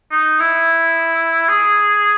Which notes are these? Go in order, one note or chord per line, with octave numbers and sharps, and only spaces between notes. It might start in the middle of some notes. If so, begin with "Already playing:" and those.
D#4
E4
G#4